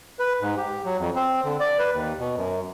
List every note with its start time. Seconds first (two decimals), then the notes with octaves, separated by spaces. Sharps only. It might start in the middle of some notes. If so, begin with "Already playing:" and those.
0.19 B4
0.41 G#2
0.57 G4
0.85 F#3
0.99 F2
1.16 C4
1.44 D3
1.60 D5
1.79 B4
1.93 D#2
2.19 B2
2.37 F#2